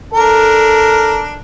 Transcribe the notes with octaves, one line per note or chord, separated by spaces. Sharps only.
D4 A4 A#4